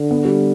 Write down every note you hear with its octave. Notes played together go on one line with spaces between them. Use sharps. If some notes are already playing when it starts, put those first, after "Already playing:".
Already playing: D3
B3
G3